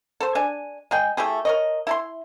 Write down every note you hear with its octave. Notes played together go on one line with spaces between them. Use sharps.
A4 C5
D4 G#5
G#3 G#4 G5
A3 E4 G4 G#4
A#4 C#5 D#5
E4 A5 C6